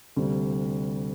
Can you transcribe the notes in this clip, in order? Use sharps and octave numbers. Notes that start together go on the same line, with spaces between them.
D2 C3 G3